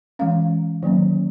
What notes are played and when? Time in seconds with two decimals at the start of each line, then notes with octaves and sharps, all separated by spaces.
0.19 E3 G#3 C#4 F5
0.83 D#3 F#3 A#3 C#4